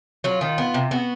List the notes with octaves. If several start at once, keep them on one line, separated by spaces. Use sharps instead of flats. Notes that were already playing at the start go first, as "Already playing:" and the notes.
F#3 F4
D#3
B3
C3
B3 F#4